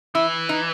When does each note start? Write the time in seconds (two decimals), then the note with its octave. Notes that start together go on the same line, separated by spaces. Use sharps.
0.15 E3 E4
0.49 D#4